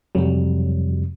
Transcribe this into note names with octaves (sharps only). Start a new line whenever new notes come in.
F2 C3 F#3 G3